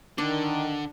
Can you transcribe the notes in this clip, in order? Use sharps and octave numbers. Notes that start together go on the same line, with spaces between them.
D3 D#3 D4